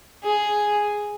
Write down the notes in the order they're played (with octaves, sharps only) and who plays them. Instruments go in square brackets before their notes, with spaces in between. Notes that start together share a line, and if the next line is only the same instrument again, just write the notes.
[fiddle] G#4